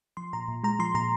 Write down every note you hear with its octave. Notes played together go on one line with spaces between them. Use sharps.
F3 C6
A#2 A#5
A#2
G#3 A#5
F3 C6
A#2 A#5